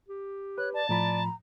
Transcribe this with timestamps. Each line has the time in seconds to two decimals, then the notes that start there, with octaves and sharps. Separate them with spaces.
0.08 G4
0.58 B4 C#5 F#6
0.74 D5 A5
0.89 A2 F3 D5 A#5 B5